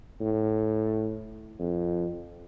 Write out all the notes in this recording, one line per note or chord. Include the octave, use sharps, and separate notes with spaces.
A2
F2